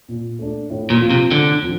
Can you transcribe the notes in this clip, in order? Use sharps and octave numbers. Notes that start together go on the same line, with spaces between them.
A#2
A3 D4
A2
A#2
F3 C4 F4
C3
A2 D3
F3 C4 F4